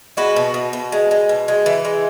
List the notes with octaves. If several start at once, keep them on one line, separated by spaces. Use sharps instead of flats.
G#3 F#4 B4
B2
B2
B2
G#3
G#3
B2
G#3
E3
G#3